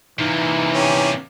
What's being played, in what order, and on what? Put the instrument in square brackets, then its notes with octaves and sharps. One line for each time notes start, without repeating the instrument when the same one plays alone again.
[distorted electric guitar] C3 A#3 [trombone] E3 [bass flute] D#4
[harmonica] C#4 G4